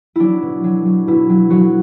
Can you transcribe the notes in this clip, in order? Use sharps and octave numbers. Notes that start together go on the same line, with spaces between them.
F#3 D4 E4
B2
F#3
F#3
B2 E4
F#3
F#3 F#4